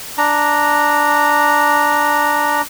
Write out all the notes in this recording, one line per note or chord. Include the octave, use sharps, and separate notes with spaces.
D4 A#5